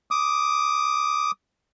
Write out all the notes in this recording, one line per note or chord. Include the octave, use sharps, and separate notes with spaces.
D6 D#6